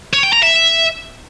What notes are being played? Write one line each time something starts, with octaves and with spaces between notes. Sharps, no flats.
C#5
G5
A#5
E5